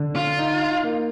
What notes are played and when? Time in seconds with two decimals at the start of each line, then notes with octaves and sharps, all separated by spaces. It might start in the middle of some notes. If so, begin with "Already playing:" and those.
Already playing: D3
0.16 F4
0.38 D#4
0.83 A#3